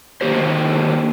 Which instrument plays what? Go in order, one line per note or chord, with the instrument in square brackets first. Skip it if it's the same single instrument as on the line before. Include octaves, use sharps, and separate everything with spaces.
[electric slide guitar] D3 D#3 A#3 G4 C5